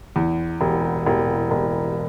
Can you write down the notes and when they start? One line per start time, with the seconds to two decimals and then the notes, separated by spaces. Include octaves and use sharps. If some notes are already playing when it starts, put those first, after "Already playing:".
0.16 E2
0.61 E1
1.06 E1
1.51 E1